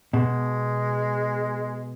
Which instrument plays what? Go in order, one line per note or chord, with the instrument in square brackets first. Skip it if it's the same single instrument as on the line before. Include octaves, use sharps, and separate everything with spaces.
[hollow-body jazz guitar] B2 [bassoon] G#3